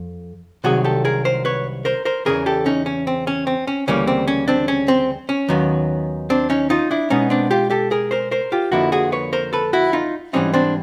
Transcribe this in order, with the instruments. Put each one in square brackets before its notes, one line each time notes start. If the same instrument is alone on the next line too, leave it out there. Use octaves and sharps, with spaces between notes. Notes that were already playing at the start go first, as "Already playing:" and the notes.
Already playing: [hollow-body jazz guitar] F2
C2 C3 D#3 F#3 F#4 G#4
G4 A4
G#4 A#4
A#4 C5
B4 C#5
A#4 C5
A#4 C5
E2 C#3 E3 G#4 A#4
G4 A4
C#4 D#4
C#4
C4
C#4
C4
C#4
D2 C#3 E3 G3 A#3 C#4
C4
C#4
C4 D4
C#4
C4
C#4
D#2 D#3 F#3 B3
C4 D4
C#4 D#4
D#4 F4
D4 E4
B2 G#3 B3 C#4 D#4
C4 D4
F4 G4
G4 A4
G#4 A#4
A#4 C5
A#4 C5
F4 G4
F2 D3 F3 A#3 E4 F#4
F#4 G#4
B4 C#5
A#4 C5
A4 B4
E4 F#4
D#4 F4
G#2 E3 G3 C4 C#4 D#4
C4 D4